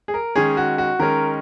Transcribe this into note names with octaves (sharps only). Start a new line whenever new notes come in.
G#4
A#4
D#3 G#3 C#4 G#4
F#4
F#4
D#3 G#3 C#4 A#4